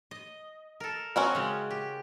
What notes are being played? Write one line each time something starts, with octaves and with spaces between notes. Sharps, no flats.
D#5
A4 A#4
C4 C#4 F#4 A#4
C#3 G#3
G4